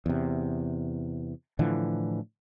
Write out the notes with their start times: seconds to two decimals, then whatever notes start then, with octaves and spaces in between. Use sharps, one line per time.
0.06 E2 C3
1.59 A2 D3 E3 F3